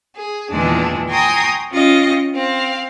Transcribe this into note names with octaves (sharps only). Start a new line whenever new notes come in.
G#4
E2 A#2 D#3 E3 G#3 D4
G5 G#5 A#5 C6 C#6 D#6
C#4 F4 D#5 G5
C4 F5